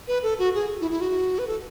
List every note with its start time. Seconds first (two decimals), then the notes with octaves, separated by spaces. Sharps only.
0.08 B4
0.23 A4
0.39 F#4
0.54 G#4
0.81 E4
0.91 E4
1.01 F#4
1.39 B4
1.47 A4